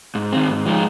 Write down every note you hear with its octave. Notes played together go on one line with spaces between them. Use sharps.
G#2
D#3 C4
G#2
F3 G#3 D#4